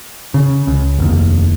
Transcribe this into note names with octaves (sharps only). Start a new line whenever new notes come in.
C#3
C#2
F1 D#2